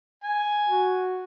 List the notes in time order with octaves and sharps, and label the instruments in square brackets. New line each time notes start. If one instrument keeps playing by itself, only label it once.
[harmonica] G#5
[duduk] F#4